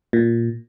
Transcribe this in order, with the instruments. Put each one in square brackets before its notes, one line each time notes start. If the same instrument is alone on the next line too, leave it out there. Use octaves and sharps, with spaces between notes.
[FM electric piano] A#2